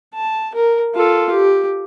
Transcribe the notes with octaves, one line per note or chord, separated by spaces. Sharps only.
A5
A#4
F4 A4
G4